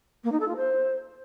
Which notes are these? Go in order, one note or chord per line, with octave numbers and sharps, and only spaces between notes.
A#3
D#4
A4
F4
C5